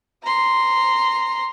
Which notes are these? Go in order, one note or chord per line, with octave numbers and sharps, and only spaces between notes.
A#5 C6